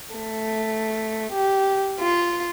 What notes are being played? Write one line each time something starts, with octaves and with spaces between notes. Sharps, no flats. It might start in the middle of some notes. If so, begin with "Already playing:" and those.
A3
G4
F4